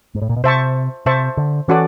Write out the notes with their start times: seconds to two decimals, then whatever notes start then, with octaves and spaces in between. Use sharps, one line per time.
0.15 G#2
0.22 A2
0.29 A#2
0.36 B2
0.44 C3 C5 E5 A5 C#6
1.06 C3 C5 E5 A5 C#6
1.37 D3
1.68 E3 C#4 F#4 A4 D5